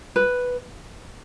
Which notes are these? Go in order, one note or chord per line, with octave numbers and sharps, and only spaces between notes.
B4